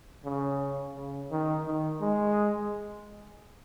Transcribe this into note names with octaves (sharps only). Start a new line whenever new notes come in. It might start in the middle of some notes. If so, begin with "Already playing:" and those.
C#3
C#3
D#3
D#3
G#3